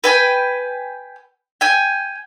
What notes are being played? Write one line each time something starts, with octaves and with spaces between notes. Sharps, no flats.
B4 G5 G#5
G5 G#5